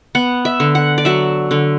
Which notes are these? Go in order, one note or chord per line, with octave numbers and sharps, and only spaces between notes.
B3 F#5
E5
D3
F#5
D5
F#3 E5
D3